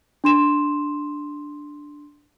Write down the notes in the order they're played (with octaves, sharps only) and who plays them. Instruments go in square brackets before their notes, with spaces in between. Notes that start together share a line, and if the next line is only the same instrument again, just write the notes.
[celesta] D4 C6 E7